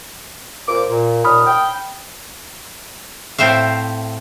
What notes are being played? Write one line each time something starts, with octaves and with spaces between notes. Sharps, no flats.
A#2 C4 D6
A#2
D#2 A#2 B5 D#6 F6
G5
A2 C4 C5 E5 F5